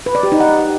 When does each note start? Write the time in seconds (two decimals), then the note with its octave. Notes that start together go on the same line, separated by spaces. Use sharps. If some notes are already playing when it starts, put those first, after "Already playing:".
0.06 B4
0.15 D5
0.23 G4
0.32 D#4
0.40 F#5